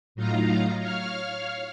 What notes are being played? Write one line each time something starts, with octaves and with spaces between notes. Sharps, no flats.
A2 F#3 D#4 F4 F5 A#5
C#5 F5 F6